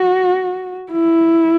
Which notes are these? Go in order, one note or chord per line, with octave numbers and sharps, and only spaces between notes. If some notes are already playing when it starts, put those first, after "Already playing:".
Already playing: F#4
E4